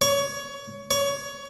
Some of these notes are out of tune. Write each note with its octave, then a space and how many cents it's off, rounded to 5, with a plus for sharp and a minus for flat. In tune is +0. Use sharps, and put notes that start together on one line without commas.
C#5 +20
C#5 +20